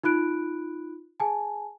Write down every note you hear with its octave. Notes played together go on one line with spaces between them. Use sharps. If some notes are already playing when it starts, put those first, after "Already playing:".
D#4 F4 B5 F#6 D7
G#4 G#5 A5